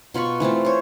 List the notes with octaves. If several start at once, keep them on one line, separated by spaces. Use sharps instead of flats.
B2 F4 B5 C#6
E3 A3 C4 F4
C5 C#5